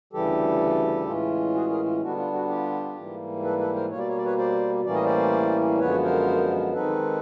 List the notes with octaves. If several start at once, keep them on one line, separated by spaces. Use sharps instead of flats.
D2 C#3 E3 G3 G4 A4
A2 E3 G#3 C#4 F4
F#4 G#4
G#4 A#4
F4
D3 G3 B3 D4 F#4
F4
F#4
F4 G4
G#2 E3 G3 A#3
A4 B4
A4 B4
A#4 C5
B2 G3 A#3 C#5
D5
C#5
D5
B4 C#5
C5 D5
A2 E3 G3 A#3 C#4 D5
D#5
C5 D5
F#2 D3 F3 G#3 B3 B4 C#5
A#4 C5
D#3 G#3 C4 D#4 A4 B4